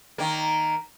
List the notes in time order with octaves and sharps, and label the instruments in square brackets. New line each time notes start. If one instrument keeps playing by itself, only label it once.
[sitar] D#3 A#3